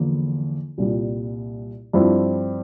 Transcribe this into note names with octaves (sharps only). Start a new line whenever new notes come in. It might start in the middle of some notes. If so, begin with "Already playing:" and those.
Already playing: E2 D3 F3 A#3
C2 A#2 G3
G2 F3 C4 E4